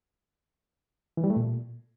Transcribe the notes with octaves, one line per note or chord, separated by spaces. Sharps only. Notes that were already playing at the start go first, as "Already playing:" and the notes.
E3
G3
A3
A#2